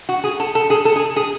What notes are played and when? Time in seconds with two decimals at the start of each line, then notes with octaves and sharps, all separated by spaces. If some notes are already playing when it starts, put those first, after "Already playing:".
0.09 F#4
0.24 G#4
0.40 A4
0.55 A4
0.70 G#4
0.85 A4
0.96 G#4
1.16 G#4